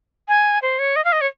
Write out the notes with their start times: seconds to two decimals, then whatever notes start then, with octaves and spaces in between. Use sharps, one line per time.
0.28 G#5
0.62 C5
0.79 C#5
0.96 D#5
1.05 F5
1.12 D#5
1.21 C#5